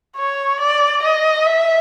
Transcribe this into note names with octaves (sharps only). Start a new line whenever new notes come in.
C#5
D5
D#5
E5